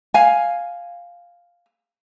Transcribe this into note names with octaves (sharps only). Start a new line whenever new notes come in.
F5 G#5